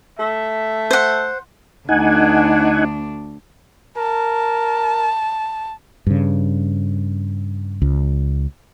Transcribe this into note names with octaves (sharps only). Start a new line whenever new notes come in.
A3 E5
C5 F#5
D2 D4 D#4 F#5 G#5
A#4 A5
G2 C#3
C#2